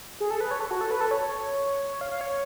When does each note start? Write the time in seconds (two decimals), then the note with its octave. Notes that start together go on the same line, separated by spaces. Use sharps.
0.20 G#4
0.31 A4
0.41 B4
0.51 C#5
0.60 A4
0.71 F#4
0.81 A4
0.91 B4
1.01 A4
1.11 C#5
2.01 F5
2.11 F5
2.21 C#5